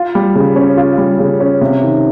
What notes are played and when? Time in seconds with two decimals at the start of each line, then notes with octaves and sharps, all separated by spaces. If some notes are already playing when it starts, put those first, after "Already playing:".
Already playing: F4
0.15 G3
0.35 C#3
0.56 C#4
0.77 F4
0.98 G3
1.19 C#3
1.40 C#4
1.61 C3
1.82 D#3